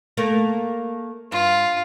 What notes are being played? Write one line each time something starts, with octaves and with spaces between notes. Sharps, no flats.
A3 A#3 A#4
G2 F4